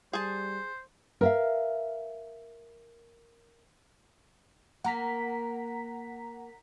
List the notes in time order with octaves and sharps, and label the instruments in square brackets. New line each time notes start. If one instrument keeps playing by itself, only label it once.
[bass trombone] G3 [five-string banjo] G#4 A5 [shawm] C5
[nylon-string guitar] A#4 E5 F5
[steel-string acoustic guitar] A#3 [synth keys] F#5 A#5 B6